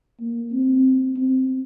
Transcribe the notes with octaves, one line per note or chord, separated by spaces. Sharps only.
A#3
C4
C4